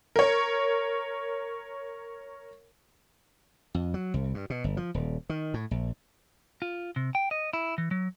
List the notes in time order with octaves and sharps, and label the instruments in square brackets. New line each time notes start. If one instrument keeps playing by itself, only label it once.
[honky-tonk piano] A#4 C#5
[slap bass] F2
F#3
C2
G2
B2
G1
F3
D#1
D#3
A2
A#1
[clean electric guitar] F4
C3
G5
D#5
E4
E3
F#3